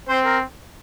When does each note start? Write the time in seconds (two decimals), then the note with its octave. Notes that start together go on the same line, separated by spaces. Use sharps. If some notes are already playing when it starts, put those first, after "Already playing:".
0.08 C4 C5
0.25 A#4